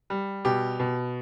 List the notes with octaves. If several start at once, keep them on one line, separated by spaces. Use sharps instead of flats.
G3
B2 G4
B2